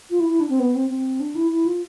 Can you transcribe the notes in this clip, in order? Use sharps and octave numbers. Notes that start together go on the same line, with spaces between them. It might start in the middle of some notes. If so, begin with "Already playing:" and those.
F4
E4
E4
D4
C4
B3
C4
C4
D4
E4
E4
F4